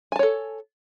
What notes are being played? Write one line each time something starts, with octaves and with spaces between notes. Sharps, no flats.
A4 C#5 G#5 A5